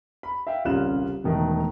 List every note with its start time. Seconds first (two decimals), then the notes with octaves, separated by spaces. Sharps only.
0.23 B5
0.47 E5 F5 G5
0.65 D#1 C2 C#3 F4 F#6 E7
1.24 E1 D#3 A3